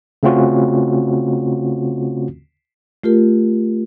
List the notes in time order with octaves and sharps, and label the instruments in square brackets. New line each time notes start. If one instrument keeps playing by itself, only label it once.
[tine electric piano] C#3 A3 C4 C#4 F4 F#4
[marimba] A3 F4 G4 A#4